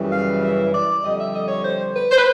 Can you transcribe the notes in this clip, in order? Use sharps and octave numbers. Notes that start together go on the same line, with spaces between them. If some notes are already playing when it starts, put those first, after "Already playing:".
Already playing: F#2 C#3 E3 G3
F5
E5
D5
F2 D3 G3 D#5
E5
D#5
C#5
C5
B4
C5
B4